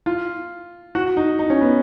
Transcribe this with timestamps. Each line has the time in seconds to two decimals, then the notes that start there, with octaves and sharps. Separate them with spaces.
0.06 F4
0.95 F#4
1.17 D#4
1.39 D#4
1.50 C#4
1.61 B3